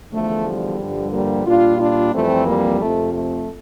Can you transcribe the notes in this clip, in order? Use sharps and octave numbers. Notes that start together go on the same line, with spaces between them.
E2 D3 F3 A3
G3
G2 D3 F3
G3 A#3
A#2 G3 D4 F4
D4 F4
F2 E3 G3 A3 C4
G3 A#3
F2 C3 F3 A3
A3